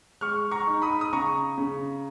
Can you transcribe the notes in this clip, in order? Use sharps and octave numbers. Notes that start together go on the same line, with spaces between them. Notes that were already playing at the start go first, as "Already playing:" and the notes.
G#3 C#6 F6
A#5 C#6
D#4
B5 D#6
D#6
C#3 A#5 C#6
C#3